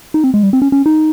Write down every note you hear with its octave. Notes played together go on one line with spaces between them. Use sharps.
D#4
C4
G#3
G3
C4
C#4
C#4
D#4